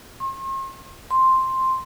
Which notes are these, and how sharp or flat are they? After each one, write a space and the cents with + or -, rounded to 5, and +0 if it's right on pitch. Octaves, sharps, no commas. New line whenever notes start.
C6 +45
C6 +5